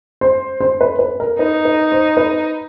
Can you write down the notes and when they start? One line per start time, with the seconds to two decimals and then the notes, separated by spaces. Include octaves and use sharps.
0.21 C5
0.60 C5
0.81 B4
0.99 B4
1.20 A#4
1.38 D#4 B4
1.65 B4
1.92 C5
2.17 B4